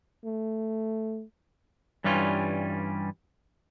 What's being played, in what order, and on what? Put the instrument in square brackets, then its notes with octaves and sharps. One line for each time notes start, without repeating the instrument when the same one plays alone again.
[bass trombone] A3
[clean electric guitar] G2 E3 G3 C#4 F4